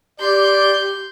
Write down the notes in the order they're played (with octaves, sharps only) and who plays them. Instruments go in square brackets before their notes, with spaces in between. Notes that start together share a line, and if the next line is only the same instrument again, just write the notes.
[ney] G4 [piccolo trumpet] D5 [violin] C6 G6